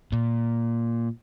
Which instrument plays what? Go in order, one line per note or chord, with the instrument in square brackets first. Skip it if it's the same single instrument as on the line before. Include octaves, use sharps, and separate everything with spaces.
[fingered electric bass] A#2